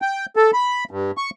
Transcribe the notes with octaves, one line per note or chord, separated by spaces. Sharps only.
G5
A4
B5
G2
C#6